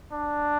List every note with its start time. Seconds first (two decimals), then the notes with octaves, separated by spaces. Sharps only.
0.12 D4